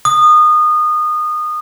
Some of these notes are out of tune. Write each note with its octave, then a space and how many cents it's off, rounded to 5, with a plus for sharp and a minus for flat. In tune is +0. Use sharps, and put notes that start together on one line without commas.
D#6 -25